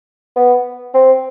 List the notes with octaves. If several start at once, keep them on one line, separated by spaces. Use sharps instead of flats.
B3
C4